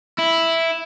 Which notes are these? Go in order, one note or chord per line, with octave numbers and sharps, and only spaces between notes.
E4